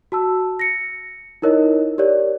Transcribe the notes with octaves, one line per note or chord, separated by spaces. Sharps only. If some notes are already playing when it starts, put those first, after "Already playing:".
F#4 A5 E6
A#6 C#7
D#4 E4 A#4 C#5 D#5
G4 A#4 C#5 D5